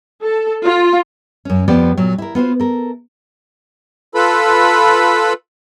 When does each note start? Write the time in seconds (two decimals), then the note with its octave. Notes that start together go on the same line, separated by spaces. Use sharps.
0.22 A4
0.63 F4
1.45 F#2 C#4
1.68 F2 F3 B3 G4 D5
1.97 A#2 F#3
2.18 E4 A#4
2.35 B3 F4 F#4 C5
2.60 A4 A#4
4.15 F4 A4 B4 B5